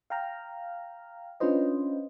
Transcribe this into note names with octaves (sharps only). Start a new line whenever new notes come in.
F5 G5 A#5 F6
C#4 D4 F4 B4 C5 D#5